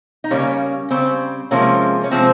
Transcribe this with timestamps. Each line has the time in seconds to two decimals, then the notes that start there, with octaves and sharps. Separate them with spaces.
0.24 D#4
0.31 C#3 G3 A#3 C#4
0.91 C#3 G3 C4
1.51 C3 F3 G#3 A#3 C#4
2.04 C#4
2.11 C3 F3 G#3 C4